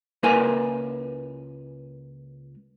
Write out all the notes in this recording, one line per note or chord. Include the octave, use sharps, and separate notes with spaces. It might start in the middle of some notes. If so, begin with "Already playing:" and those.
C#2 A#3 E4 A#4 B4 G#5